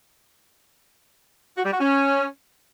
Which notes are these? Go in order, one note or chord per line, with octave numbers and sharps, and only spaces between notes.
F#4
G3
F#4
C#4